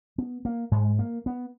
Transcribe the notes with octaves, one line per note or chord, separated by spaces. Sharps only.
B3
A#3
G#2 G#3
A#3
B3